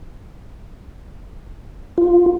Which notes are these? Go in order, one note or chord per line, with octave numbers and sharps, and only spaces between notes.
F4